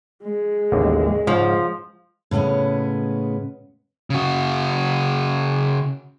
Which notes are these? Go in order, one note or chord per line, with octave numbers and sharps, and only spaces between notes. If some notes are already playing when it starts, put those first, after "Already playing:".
G#3
A1 D#2 D3
G#2 C#3 F3
A2 C#3 G#3 B3 C#4
C#3 F#4